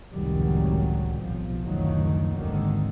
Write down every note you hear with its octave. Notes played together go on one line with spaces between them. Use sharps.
F1 C#2 A2 D#3 F#3 G3
B1 F3
F#1 D2 D#3 F3 F#3
G#1 D#2 D3 D#3